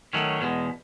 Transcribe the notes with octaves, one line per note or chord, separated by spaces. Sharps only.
D#3 F#3 A3 C#4
E2 B2 G#3